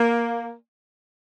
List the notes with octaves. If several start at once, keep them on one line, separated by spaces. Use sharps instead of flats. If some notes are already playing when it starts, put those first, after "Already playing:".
Already playing: A#3